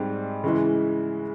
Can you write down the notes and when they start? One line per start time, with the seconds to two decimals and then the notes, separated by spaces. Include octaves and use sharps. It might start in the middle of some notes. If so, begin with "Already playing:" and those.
Already playing: G#2 G3 C4
0.44 C#3 E3 G#3